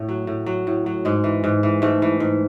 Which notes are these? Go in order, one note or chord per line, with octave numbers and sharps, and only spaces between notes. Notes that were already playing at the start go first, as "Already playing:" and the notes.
Already playing: A2 A3
F#3
A2
F#3
A2
F#3
G#2 G#3
E3
G#2
E3
G#2 A3
E3
G#2